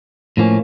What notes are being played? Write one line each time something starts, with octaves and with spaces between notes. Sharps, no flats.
A2 F3 A#3 C#4